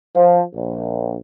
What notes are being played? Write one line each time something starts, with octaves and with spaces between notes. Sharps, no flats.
F3
A#1